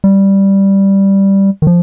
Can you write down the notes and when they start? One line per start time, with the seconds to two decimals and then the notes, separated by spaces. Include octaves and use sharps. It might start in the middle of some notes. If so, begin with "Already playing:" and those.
0.04 G3
1.62 D#3
1.67 F3